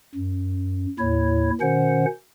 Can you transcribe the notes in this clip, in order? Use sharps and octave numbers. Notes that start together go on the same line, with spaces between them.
F#2
D#2 A2 E4 C#5
B2 D#3 C#4 C5 F#5